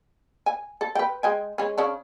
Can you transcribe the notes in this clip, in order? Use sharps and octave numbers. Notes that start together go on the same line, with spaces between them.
G#5
A4
B4 G5
G#3 G5 G#5
G#3 C#4
C#3 C#4 D4